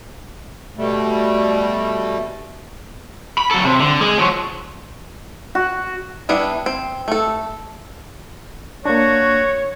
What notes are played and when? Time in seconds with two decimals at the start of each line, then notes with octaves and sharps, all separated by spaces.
0.77 B2 G3 A3
3.38 B5
3.51 F#3 A4
3.65 C3
3.80 D3
4.02 G#3
4.18 F3 F#3
5.55 F#4
6.29 G3 B3 D4 E4
6.66 C4
7.08 A3 A4
8.86 A#3 D4 F#4 C#5